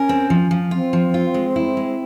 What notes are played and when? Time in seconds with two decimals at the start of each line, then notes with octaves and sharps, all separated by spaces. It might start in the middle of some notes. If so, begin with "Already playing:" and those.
Already playing: C#4 A#4
0.09 C4
0.30 F3
0.51 F3
0.71 C4 F4
0.93 F3
1.14 F4
1.34 G#3
1.56 E4
1.77 G#3